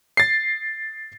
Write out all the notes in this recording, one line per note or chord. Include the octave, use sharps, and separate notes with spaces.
A6 C7